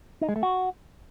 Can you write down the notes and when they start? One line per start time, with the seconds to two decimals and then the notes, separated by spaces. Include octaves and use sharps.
0.21 D#4
0.29 G#3
0.36 A3
0.43 F#4